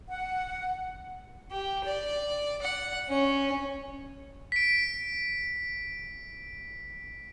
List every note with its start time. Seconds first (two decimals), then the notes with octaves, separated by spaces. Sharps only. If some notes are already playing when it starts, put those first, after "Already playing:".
0.09 F#5
1.51 G4
1.85 D5
2.62 F#5
3.09 C#4
4.52 B6 D7